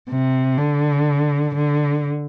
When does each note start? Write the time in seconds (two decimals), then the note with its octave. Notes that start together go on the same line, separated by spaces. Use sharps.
0.10 C3
0.58 D3
1.56 D3